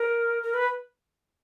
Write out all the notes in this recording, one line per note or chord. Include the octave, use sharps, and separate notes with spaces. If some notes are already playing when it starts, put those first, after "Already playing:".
Already playing: A#4
A#4
B4